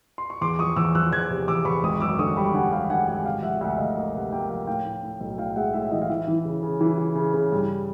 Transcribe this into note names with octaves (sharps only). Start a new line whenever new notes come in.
C6
C#6
E2 C6 D6
F3 C#6 D#6
E2 D6 E6
F3 E6 F#6
E2 F#6 G#6
C3
E2 D6 E6
E2 B5 C#6
G#1 C#6 D#6
F#2 D6 E6
D3 C#6 D#6
G3 B5 C#6
D3 F#5 G#5
G3 F5 G5
D3 F#5 G#5
G#1 F#5 G#5
C3 F5 G5
F3 E5 F#5
D2 E5 F#5
D2 D#5 F5
A#3 D#5 F5
C3 E5 F#5
A#3 F5 G5
F3 F5 G5
A2 F5 G5
A2
A2
B1
A2 F5 G5
G#3 E5 F#5
A2 E5
E3 D#5
F5
E3 E5
E3
C#3
C#3
E3
E3
C#3
C#3
G2